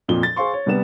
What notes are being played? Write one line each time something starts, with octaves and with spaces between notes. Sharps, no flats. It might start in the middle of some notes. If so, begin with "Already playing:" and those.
F2 A#2 F3 G7
A6
G#4 C5 F5 C6 C#6
C#5
C2 G3 B3 E7